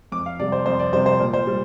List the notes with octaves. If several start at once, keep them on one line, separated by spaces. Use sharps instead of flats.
F2 D6
F5
C3 G3 D5
C5
F2 C5
D5
C3 G3 C5
C5
A#2 D5
C5
G3